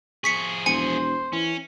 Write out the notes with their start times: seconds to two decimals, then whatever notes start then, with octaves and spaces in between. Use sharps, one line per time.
0.24 F3 G#4 C#6 B6 C#7
0.66 E1 C5 G#5 C#7
1.33 E3 C#4